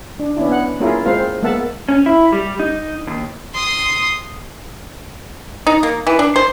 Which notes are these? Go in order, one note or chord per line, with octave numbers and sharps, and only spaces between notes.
D4
B3 C#4 D4 E4
B3 F#5
A#3 C#4 E4 F4 G#4 A#4
G#3 C4 F4 C5 F5
G#3 A#3 B3 E5 F#5 A5
C#4
E4
G3
D#4
D#2
C6 D#6
D#4
A#3
E3
D4
C5